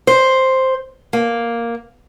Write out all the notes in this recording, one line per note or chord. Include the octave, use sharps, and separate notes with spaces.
C5
A#3